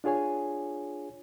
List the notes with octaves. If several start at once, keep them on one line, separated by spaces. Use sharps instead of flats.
D4 F4 G#4 C#5 G#5